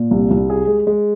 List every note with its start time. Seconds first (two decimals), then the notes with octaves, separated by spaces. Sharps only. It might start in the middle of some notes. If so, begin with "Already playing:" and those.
Already playing: A#2
0.11 C2
0.31 C2
0.50 G#4
0.67 G#3
0.87 G#3